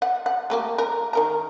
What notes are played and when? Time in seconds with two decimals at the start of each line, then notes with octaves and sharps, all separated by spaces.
0.02 F#5
0.26 F#5
0.50 A3 A#3 G4
0.78 A#4
1.13 D#3 A#4 A#5